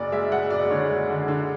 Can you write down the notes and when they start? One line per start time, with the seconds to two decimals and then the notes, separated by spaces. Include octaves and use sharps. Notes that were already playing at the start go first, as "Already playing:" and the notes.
Already playing: F#1 D5
0.12 G#3 E5
0.32 G#3 F#5
0.50 F#1 D5
0.70 D3 C#5
0.89 G#3
1.10 D3
1.28 D3